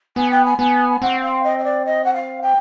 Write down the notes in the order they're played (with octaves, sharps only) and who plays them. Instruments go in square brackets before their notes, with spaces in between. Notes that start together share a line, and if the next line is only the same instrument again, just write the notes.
[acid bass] B3 [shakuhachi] G#5
[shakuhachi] G5
G#5
[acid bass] B3 [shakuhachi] G#5
[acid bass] C4 [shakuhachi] F#5
[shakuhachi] F5
D#5
D#5
D5
D#5
F#5
F5
G5